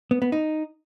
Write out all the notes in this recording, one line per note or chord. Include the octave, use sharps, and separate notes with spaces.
B3
B3
D#4